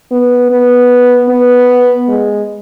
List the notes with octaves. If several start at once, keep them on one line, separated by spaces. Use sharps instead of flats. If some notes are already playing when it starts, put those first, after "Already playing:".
B3
B3
B3
G#3